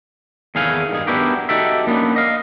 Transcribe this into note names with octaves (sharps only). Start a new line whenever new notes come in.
E2 D#3 G#4 A4 F5 G#5
G2 D#3 G#4
B3 D4 E4 F#4 G4 A#4
D#4 F#4 G4 A4 D5 E5
A#3 B3 C#4 D4
D#5 F5